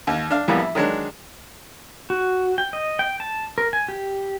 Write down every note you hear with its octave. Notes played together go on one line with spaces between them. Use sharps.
D#2
D4 F5
F2 A2 E3 G3 A#3 B3
E4
D#3 F#3 G#3 D4
F#4
G5
D#5
G5
A5
A#4
G#5
G4